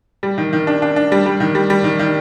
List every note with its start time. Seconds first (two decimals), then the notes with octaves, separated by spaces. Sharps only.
0.23 G3
0.38 D#3
0.53 D#3
0.67 D4
0.82 D4
0.96 D4
1.12 G3
1.26 G3
1.40 D#3
1.55 G3
1.70 G3
1.84 D#3
1.99 D#3